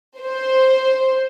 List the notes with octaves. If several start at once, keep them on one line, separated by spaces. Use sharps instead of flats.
C5